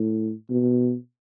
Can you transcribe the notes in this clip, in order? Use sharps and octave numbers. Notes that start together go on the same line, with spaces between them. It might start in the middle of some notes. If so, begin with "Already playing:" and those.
Already playing: A2
B2